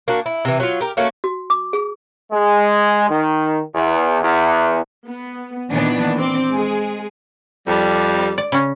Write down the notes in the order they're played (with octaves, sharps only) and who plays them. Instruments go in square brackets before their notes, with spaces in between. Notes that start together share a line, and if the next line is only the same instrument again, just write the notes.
[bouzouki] A#3 D4 F#4
E4
C3 E3
F#3 F4
G4 A#4
A3 A#3 C#4 F#4
[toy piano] F#4
D6
G#4
[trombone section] G#3
D#3
E2
E2
[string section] B3
A#2 D#3 E3 B3 D4
C4 D6
G#3 G#4
[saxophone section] F2 G3
[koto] D5
C#3 C#4